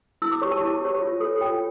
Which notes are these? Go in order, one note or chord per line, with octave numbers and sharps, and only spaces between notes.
E4 E6
D6
G4 C#5 C#6
A5
E4
G4 C#5
F4
A4 C#5
F4 G5